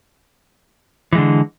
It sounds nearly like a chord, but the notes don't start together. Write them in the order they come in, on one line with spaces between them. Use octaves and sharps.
E3 G#3 D3